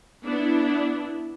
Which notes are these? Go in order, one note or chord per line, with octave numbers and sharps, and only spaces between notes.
B3 D4 E4